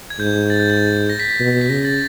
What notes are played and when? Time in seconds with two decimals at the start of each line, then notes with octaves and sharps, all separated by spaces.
0.10 G#6
0.19 G#2 G6
0.50 A6
0.60 G6
0.70 A6
1.10 A#6
1.19 B6
1.30 B6
1.40 B2
1.61 B6
1.70 C#3 A#6
1.85 A6